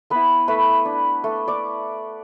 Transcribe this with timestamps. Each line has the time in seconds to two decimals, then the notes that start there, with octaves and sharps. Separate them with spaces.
0.10 B3 E4 B4 B5
0.48 A3 B4 B5
0.85 D4
1.24 A3
1.48 D5 D6